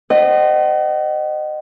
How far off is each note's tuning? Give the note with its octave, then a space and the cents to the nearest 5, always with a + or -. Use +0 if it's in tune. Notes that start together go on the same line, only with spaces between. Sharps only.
C5 +0 D#5 -25 F#5 +40